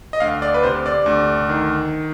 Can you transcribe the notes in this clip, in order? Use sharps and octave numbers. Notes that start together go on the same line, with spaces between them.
D#5
D2 F5
D5
B4
C3 C5
D5
D2
D#3